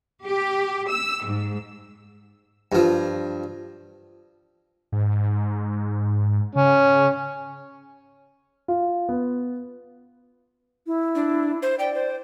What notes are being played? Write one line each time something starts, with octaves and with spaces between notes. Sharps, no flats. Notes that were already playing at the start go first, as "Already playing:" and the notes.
G4
E6
G#2
G2 F3
G#2
C#3 C#4
F4
B3
E4
D4
C5
D5 G5
C5